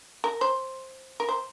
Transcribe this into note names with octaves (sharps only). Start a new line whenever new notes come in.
A#4
C5
A#4
C5